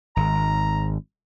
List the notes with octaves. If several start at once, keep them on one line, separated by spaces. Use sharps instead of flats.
G#1 A#5